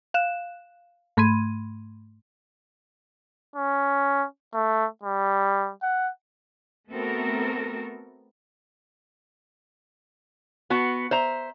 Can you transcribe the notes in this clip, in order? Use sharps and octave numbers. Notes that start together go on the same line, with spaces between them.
F5 F#6 E7
G#2 A3 B5 C6 G#6 D#7
C#4
A3
G3
F#5
A3 B3 C4 F#4 A4 A#4
B3 F#4 B4 A5
C5 E5 A#5